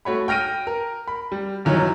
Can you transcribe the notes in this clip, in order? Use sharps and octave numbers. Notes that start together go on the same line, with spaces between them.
A3 F#4 C#5 B5
G5 F6 A#6 D7 D#7
A#4
B5
G3
G1 D#3 E3 F#3 C#5